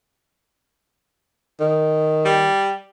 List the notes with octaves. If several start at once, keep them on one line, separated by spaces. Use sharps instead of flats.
D#3
G3